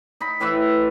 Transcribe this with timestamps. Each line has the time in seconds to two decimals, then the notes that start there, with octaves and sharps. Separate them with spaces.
0.20 D#4 B5
0.40 A2 E3 B4 E5